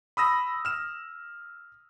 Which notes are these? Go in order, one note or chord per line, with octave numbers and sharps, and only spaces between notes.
B5 D#6 E6 A#6
F6 E7